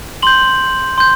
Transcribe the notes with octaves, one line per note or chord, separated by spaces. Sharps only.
C6 G6 F#7
C6 G6